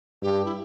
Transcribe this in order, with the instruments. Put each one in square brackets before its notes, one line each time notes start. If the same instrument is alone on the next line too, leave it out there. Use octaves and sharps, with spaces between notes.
[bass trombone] G2 [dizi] G4
[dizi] E4